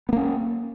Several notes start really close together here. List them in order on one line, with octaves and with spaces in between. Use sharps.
B3 A#3 C#4